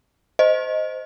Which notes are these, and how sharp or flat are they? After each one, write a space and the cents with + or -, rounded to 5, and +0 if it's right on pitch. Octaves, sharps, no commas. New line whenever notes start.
C5 -15 D#5 +0